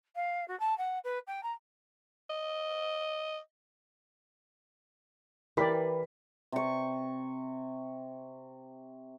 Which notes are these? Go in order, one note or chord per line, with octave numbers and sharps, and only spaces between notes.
F5
F#4
A5
F#5
B4
G5
A#5
D#5
E3 G4 A#4 D5 B5 B6
C3 C#6